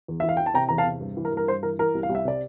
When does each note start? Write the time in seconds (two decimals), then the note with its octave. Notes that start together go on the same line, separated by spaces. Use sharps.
0.08 E2
0.20 E3 E5
0.29 F5
0.37 E3 G5
0.46 A5
0.54 C3 G5 A#5
0.68 E2 A#5
0.78 F5 A5
0.86 C3
1.01 G2
1.17 E3
1.25 A#4
1.32 G2
1.37 A#4
1.47 G2 C5
1.63 E3 A#4
1.79 E3 A#4
1.95 C2
2.03 F5
2.09 C2
2.15 E5
2.25 C3 D5